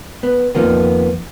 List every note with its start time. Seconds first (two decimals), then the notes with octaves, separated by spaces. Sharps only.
0.23 B3
0.55 F2 D#3 F3 A#3 B3